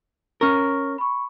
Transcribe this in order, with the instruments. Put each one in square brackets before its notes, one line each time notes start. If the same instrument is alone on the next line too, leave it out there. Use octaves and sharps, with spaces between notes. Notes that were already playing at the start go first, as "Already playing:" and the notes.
[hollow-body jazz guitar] C#4 A#4 [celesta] C#6 F6
[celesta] B5 C#6